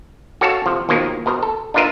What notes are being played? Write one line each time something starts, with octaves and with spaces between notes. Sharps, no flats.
F#4 A4 C#5 F5 A5
C3 F3
D#2 B2 D#3 F3 A#3
B2 A#4 C5 A#5
A4
D4 D#4 F4 A#4 B4 E5